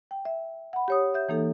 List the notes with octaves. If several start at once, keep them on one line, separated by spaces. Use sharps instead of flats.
G5
E5
F#5 B5
G4 C#5 D#6
E5 G6
E3 A#3 D#4 A4